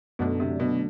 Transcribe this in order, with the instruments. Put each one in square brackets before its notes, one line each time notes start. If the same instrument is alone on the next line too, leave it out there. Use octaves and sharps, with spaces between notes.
[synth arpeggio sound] F#2 D3 F#3 A3 D4 [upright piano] B2
[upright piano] C3
B2